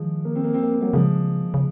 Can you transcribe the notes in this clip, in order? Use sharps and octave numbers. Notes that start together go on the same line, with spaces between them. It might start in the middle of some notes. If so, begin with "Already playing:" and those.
Already playing: D#3 F3 G#3
A#3
C4
A#3
C4
A#3
C4
F#3 A#3
C#3 F3 G#3
C#3